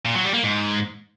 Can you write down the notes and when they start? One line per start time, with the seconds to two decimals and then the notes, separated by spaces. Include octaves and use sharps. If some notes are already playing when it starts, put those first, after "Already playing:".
0.05 A#2
0.15 F#3
0.24 G3
0.34 A#3
0.44 G#2